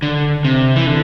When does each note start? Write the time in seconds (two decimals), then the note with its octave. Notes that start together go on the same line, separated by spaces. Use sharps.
0.02 D3
0.45 C3
0.76 E3
0.86 D3